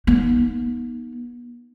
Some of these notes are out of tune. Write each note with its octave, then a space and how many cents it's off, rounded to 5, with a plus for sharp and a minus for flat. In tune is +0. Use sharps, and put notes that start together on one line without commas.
B3 -40 D#4 +0